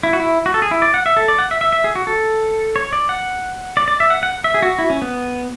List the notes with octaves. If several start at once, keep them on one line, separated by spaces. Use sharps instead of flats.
E4
F#4
E4
F#4
A4
G#4
E4
D5
F#5
E5
A4
D5
F#5
E5
E5
E5
G#4
F#4
A4
C#5
D5
F#5
D5
D5
E5
F#5
F#5
E5
G#4
F#4
E4
C#4
B3